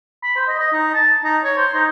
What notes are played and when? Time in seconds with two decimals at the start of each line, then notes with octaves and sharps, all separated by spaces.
0.23 B5
0.36 C5
0.48 D#5
0.59 D#5
0.73 D#4
0.94 A5
1.24 D#4
1.44 C#5
1.57 C5
1.74 D#4